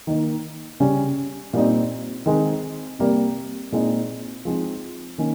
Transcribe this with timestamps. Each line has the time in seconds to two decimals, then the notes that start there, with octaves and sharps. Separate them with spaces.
0.07 D#3 A#3 D#4
0.80 C#3 G3 C#4
1.53 A#2 G3 C4 D#4
2.26 D#3 G#3 C4
2.99 C3 G3 A#3
3.72 A#2 G#3 C4 D#4
4.45 F3 G#3 C4 D#4
5.18 D#3 A#3 C#4